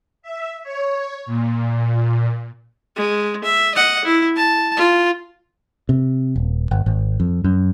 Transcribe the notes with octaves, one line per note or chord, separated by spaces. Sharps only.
E5
C#5
A#2
G#3
E5
D#5 F#5
E4
A5
F4
C3
D#1
G1
G#1
F2
F#2